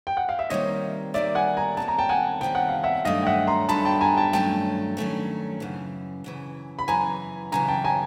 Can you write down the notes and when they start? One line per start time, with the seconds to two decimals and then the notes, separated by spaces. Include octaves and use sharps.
0.07 G5
0.17 F#5
0.29 F5
0.39 E5
0.50 C3 D#3 G3 A#3 C#5 D#5
1.14 C3 D#3 G3 A#3 D5 E5
1.35 F#5 G#5
1.57 G#5 A#5
1.77 C3 D#3 G3 A#3 A5
1.88 A#5
1.98 G5 A5
2.09 F#5 G#5
2.41 C3 D#3 G3 A#3 G5
2.55 F#5
2.69 F5
2.84 E5 F#5
3.05 G2 D#3 F#3 A3 C#4 D#5 F5
3.23 G5
3.26 E5 F#5
3.47 A#5 C6
3.69 G2 D#3 F#3 A3 C#4 A5 B5
3.85 G5 A5
4.01 G#5 A#5
4.17 G5 A5
4.33 G2 D#3 F#3 A3 C#4 G5 A5
4.97 G2 D#3 F#3 A3 C#4
5.60 F#2 C#3 E3
6.24 F#2 C#3 E3
6.79 B5
6.88 F#2 C#3 E3 G#5 A#5
7.52 F#2 C#3 E3 G#5 A#5
7.68 G5 A5
7.84 G#5 A#5